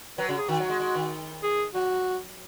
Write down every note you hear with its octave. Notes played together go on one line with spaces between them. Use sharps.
F#3 B4
C#3 F#4
G#4
D#3 F#4
F#3
G#3
G#3
D#3
G#4
F#3 F#4